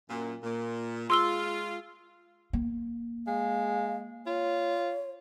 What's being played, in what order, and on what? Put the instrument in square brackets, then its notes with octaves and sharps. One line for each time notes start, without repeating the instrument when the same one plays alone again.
[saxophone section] F#2 A#2
A#2
[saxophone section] G#3 F4 [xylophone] C6 E6 G7
[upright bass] A#3
[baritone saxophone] G#3 [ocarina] F5
[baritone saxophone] F4 [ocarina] C#5